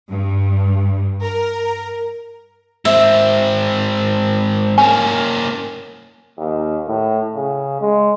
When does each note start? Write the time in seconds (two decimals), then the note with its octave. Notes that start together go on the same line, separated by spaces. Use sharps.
0.11 G2
1.21 A#4
2.85 G#2 C4 E5
4.78 A#3 C#4 G#5
6.38 D#2
6.88 A2
7.36 C#3
7.81 G#3